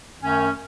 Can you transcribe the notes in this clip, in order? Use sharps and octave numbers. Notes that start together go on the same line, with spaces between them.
F#2 D#3 A3 C#4